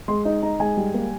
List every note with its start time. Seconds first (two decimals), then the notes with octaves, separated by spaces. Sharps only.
0.08 G#3 C6
0.25 D#4
0.43 D#4 A#5
0.60 G#3 G#5
0.77 G3
0.94 A#3